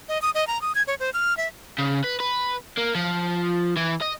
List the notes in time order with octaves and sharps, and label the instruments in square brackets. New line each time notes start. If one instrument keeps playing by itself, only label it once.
[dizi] D#5
D#6
D#5
A#5
D#6
G#6
C#5
C5
F6
E5
[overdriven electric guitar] C#3
B4
B4
A#3
F3
E3
D#5